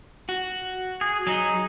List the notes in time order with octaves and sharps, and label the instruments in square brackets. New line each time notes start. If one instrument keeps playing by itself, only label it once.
[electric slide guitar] F#4
[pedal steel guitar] G#4
[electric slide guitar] F#3 [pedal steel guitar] D#4 G#4